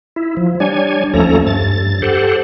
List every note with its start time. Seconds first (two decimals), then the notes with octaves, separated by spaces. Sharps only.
0.16 E4
0.37 F3
0.60 G3 D4 C#5 G#5
1.14 D#2 F3 A3 C#4 A4 A#5
1.47 G2 A6
2.02 G4 A4 C5 F#5